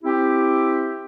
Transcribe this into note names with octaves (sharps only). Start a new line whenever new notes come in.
C4 E4 G4